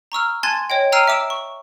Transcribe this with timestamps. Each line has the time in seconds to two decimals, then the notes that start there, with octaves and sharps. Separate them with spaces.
0.12 A#5 C#6 E6 F6
0.43 G#5 A5 C6 F#6 G#6 A6
0.70 C#5 D#5 G5
0.92 G5 A#5 E6 F6 C7 D#7
1.08 E5 D6 E6 D7 E7
1.30 C#6